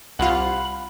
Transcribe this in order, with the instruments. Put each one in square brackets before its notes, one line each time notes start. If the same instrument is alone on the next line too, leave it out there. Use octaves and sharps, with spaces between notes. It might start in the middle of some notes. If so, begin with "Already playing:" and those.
[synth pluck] C2 F4 [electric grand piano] F5 F#5 [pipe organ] B5